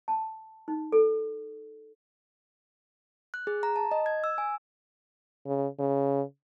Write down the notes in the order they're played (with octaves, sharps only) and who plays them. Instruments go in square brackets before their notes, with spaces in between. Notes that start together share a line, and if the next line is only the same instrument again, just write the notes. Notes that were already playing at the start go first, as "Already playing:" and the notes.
[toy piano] A5
D#4
A4
[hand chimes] F#6
G#4
A#5
A5
D#5
G#6
E6
G#5
[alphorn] C#3
C#3